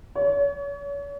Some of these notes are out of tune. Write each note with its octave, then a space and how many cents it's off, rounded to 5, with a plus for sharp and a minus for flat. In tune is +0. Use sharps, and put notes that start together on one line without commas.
C#5 +40